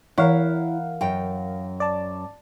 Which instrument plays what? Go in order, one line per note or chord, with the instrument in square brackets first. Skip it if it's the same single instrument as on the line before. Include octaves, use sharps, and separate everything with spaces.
[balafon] E3 C#5 [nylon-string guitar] E4 [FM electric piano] A#4 F5 F#5
[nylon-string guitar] F#2 G5
[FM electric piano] D5 A5